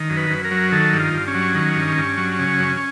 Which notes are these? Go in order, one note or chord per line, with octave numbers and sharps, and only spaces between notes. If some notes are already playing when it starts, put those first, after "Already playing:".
Already playing: D#3
F#2
B4
F#2
A#4
F#3
D#3 A4
G2
F4
G2
C#4
F#3
D#3
G2
G2
F#3
C#3
F#2